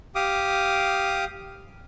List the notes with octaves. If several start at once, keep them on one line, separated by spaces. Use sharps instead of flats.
G4 F5 D6 D#6